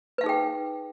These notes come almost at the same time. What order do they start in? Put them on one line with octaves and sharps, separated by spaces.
B4 F5 D#4 G#4 G5